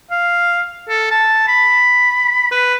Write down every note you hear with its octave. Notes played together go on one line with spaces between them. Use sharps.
F5
A4
A5
B5
B4